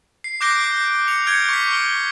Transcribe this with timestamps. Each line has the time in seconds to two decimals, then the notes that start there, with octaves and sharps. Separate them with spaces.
0.24 C7
0.41 D6 F#6 G6 A#6 D7 G7
1.07 C#7 F7
1.27 F6 G6 G#6 C#7 D7 G7
1.49 C#6 B6
1.73 G7